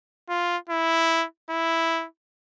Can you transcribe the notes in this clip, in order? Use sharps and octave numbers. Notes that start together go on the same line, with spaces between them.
F4
E4
E4